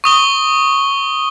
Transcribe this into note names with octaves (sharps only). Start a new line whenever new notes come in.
C#6 D#6 G7